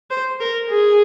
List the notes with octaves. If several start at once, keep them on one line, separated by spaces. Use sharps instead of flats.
C5
A#4
G#4